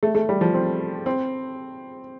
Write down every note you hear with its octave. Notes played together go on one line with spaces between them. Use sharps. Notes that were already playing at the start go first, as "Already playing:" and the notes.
A3
A3
G3
F3
C4
C4